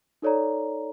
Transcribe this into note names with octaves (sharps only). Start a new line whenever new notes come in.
D#4 A4 C#5 D5 A#5